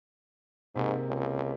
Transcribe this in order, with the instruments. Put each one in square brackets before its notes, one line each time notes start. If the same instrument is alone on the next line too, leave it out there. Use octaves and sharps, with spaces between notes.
[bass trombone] G#2 [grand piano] C3 A#3
[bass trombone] C#2